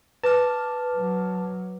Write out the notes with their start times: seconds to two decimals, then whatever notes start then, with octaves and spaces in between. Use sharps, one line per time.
0.24 B4 A5 D6 F6
0.95 F#3